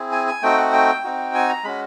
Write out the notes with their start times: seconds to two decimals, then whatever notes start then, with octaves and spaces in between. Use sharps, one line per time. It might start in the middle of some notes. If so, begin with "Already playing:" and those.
Already playing: C4 E4 G#4
0.12 G#5
0.27 G#5
0.42 A3 C4 D#4 F#4 G5
0.58 F#5
0.73 G5
1.04 C4 D#4 F#4
1.35 G#5
1.49 A#5
1.64 G#3 C#4 F#4 B5